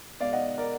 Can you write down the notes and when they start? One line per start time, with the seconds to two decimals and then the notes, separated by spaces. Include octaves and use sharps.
0.20 B2 G#3 B3 D5 F5
0.33 D#5 F#5
0.58 A#4 D5